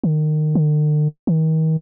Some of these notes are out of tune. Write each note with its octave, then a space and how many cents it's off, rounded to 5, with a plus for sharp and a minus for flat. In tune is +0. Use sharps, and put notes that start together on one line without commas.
D#3 -25
D3 +45
D#3 +35